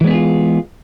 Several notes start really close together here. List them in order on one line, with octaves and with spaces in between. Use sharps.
E3 G#3 B3 G#4 F4